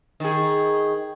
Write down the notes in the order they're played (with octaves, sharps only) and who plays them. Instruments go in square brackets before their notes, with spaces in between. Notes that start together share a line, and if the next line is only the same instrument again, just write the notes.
[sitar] D#3 G#4